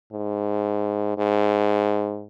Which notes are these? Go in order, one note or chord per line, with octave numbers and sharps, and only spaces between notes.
G#2
G#2